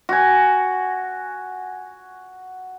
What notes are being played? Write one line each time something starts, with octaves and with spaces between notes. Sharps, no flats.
F#4 G#5